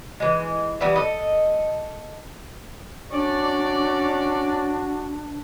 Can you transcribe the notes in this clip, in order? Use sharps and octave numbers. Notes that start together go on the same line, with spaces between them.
E3 G#3
E3 G3 B3 E4
A4 D#5
C#4 D4 F#4 C#5 D5